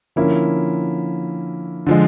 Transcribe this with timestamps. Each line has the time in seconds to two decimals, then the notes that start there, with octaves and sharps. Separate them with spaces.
0.16 D3 F3 A#3 C#4 E4
1.87 D3 F3 G#3